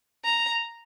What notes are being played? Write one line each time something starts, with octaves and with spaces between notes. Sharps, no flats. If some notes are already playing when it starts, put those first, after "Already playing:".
A#5